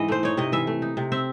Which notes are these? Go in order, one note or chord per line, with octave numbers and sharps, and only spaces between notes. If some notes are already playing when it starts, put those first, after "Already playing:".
Already playing: G#2 E3 D#5
A3 C5
D#4 C#5
C3 D#5
E3 E5
A3
D#4
C3
C4 E5